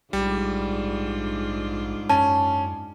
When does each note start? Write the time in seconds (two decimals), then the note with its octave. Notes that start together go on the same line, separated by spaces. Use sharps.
0.13 A#1 G#2 G3 D4 F4
2.10 F#2 C#4 A5